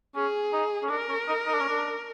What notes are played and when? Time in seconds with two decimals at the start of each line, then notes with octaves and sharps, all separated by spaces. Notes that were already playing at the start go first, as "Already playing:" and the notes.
0.15 C#4 G#4
0.53 D#4
0.83 C#4
0.90 D4 A#4
1.09 C#4
1.28 D#4
1.47 D#4
1.54 D4
1.61 C#4
1.68 D4